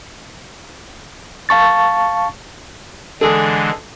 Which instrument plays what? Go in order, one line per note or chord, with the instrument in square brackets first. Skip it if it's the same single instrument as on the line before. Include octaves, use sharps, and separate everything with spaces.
[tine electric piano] F5 A5 C#6 A6
[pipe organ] D3 E3 G#3 [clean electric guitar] D4 G#4 [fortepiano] A4